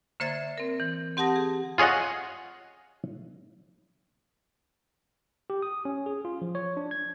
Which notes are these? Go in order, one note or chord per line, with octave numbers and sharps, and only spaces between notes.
D3 A#3 C5 E5 G#6 A6
C4 A#4
E3
C4 G4 F#5 A5 D#6 A#6
G#4
F4 G#4 C#5 D#5 F#5
G4
D#6
C#4
G#4
F4
F3
C#5
D4
G#6